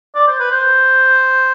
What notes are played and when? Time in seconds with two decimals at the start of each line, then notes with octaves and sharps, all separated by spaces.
0.15 D5
0.28 C5
0.40 B4
0.51 C5